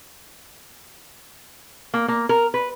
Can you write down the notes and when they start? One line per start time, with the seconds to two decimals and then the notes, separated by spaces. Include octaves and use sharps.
1.94 A#3
2.08 A#3
2.29 A#4
2.54 B4